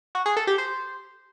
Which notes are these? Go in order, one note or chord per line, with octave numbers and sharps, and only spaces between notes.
F#4
G#4
A4
G4
C5